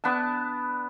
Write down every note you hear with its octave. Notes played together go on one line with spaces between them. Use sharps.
B3 D4 A5